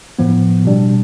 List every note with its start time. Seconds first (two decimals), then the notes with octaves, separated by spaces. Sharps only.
0.19 A2 F3 B3
0.65 B2 G3 D4